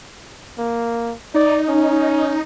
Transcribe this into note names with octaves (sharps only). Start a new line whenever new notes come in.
A#3
D#4 D5
C#4